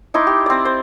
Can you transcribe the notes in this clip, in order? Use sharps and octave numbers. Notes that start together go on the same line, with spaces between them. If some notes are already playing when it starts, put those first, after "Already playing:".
D#4 E4 C6 D6
G4
C4 D5
C5